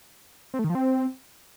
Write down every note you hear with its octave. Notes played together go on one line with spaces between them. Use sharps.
C4
A3
D#3
F3
C4